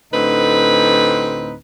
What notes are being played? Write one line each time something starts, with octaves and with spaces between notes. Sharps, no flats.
D2 A2 D3 C4 D#4 B4